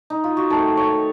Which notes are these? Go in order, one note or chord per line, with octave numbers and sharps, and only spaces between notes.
D#4
F4
F#4
D#3 A3 C4 A4
C#5